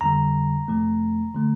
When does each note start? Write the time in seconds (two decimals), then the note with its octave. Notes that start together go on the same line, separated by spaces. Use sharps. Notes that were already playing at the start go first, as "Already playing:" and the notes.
0.01 F2 D3 G3 A#5
0.68 F2 C3 F3 A3
1.34 D3 F3 A3